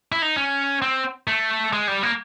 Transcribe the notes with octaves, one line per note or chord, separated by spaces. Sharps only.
E4
D#4
C#4
C4
A3
G#3
G3
A#3